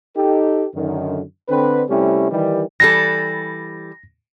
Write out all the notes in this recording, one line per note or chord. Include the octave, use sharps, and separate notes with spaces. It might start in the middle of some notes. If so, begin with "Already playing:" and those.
D#4 G4 A4
F#2 D3 D#3
D3 C4 B4
C3 G3 A3 C4 C#4 E4
D#3 E3 G3
E3 G3 A4 A#6